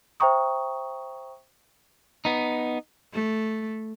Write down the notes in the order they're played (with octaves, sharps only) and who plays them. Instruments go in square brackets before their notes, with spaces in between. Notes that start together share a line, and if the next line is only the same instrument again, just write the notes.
[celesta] C5 E5 G5 A#5 C#6 D#6
[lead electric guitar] B3 D#4
[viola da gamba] A3